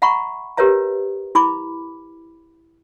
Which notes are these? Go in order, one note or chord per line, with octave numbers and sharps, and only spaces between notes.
E5 F#5 A#5 B5 C#6
G4 A#4 B4 C#5 E5 A#5
E4 B5 D6